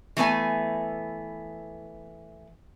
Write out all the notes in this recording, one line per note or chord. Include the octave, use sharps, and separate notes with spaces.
E3 A3 B3 G#5